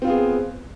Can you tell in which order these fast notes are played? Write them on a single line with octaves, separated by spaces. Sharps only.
C4 F4 B3 G#4